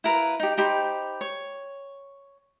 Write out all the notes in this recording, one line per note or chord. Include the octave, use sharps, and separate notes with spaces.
E4 A#4 B4 F5
D#4 G4
D#4 G4 C5 B5
C#5